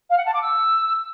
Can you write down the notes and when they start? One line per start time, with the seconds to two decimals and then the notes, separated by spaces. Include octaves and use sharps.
0.10 F5
0.18 F#5
0.26 A5
0.34 D6
0.42 E6